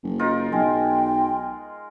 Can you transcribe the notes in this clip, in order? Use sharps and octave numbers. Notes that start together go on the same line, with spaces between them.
F#1
D#4 F4 A#4
B1 G#3 G5